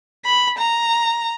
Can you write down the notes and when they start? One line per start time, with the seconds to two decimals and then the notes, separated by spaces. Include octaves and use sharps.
0.25 B5
0.58 A#5